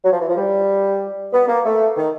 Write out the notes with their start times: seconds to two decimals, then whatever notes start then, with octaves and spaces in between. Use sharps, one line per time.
0.04 F#3
0.12 F3
0.21 E3
0.28 F3
0.37 G3
1.33 B3
1.48 A#3
1.64 A3
1.97 D#3